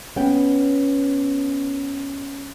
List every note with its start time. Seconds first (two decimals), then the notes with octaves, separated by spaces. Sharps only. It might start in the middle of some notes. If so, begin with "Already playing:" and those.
0.16 B3 C#4 G5